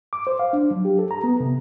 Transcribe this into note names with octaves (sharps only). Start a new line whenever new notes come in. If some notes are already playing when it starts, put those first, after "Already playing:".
D6
C5
F5
D4
F#3
G4
A4
A#5
B3
C3